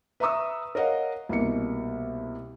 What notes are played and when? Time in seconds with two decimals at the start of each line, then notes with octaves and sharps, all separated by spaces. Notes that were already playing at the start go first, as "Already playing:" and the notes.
0.20 B4 E5 A#5 C#6 D#6 E6
0.75 A#4 C#5 D#5 F5 F#5
1.29 C2 B2 A#3 C#7